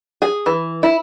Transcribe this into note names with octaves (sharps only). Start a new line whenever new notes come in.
G#4
E3
E4